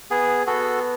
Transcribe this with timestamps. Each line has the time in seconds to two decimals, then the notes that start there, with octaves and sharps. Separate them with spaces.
0.11 B3 G#4
0.47 B3 F#4 A4